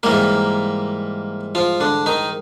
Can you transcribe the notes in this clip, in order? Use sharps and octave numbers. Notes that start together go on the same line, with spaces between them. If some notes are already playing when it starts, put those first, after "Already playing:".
G#2 E3 G3 A#3 A#4
F3 F4
D3 D4
D#3 D#4